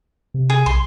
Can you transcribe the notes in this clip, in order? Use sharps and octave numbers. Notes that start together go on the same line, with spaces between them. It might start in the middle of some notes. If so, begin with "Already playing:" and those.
C3
G#4
B1 C6